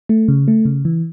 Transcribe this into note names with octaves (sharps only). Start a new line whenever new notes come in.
A3
C#3
A3
C#3
E3